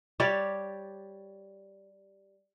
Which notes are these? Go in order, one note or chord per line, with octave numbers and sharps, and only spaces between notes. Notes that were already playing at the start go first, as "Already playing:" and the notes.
G3 G4 C#5 D5